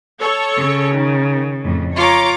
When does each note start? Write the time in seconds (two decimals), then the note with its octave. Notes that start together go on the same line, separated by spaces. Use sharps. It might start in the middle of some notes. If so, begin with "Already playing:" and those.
0.20 A4 C#5
0.56 C#3
0.93 D#3
1.64 F2 A2
1.95 F4 C#5 A#5 D6